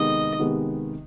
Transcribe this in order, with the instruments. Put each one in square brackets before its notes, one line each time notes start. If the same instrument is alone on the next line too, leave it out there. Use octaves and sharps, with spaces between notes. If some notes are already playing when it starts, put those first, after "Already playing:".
Already playing: [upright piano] C3 D#3 G#3 B3 D#4 [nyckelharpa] D#5
[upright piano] C3 D#3 G#3 B3 D#4